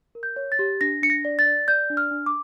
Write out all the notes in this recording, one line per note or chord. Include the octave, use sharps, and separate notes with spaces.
A#4
G6
C#5
A6
G4
D4 A#6
D4 C#7
A#6
D5
A6
D5
D5 G6
D4
F6
D4
D6